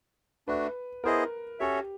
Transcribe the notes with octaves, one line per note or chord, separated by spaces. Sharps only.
A3 D4 F#4 B4
B3 E4 G#4 A#4 C5 D#5
C#4 F#4 G4 A4 C#5 E5